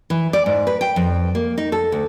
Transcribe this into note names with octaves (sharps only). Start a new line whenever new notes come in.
E3
D5
G#2
B4
G5
F2
A#3
D#4
A4
D2